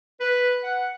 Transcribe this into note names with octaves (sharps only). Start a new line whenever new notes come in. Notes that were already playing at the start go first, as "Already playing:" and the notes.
B4
F#5